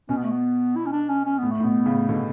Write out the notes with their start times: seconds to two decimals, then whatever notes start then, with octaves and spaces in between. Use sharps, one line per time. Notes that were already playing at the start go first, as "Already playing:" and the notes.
0.09 B2 C#4
0.17 B3
0.23 A3
0.31 B3
0.76 E4
0.86 C#4
0.92 D4
1.09 C#4
1.25 C#4
1.38 A2 B3
1.51 A3
1.60 A2
1.64 B2 B3
1.86 A2 C#3
2.09 B2 D3 B3